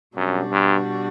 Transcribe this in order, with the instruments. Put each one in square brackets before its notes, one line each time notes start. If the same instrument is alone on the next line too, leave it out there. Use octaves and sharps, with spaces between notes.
[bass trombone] F#2 [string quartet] B2 G3 D4 F#4
[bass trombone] G2